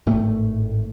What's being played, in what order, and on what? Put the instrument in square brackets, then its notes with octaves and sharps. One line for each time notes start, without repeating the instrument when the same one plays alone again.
[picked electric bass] G#1 A2 A3